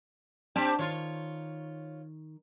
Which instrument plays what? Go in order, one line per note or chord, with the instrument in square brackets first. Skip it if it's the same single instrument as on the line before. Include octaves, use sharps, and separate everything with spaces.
[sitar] C4 G4 [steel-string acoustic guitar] D4 D5 A5
[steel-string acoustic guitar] D#3 [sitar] F4 C#5